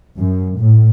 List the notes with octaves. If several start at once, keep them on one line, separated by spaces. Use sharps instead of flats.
F#2
A2